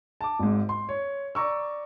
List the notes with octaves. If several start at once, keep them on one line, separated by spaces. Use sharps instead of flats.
A5 D6
G#1 G#2
C6
C#5
D5 A#5 C#6 E6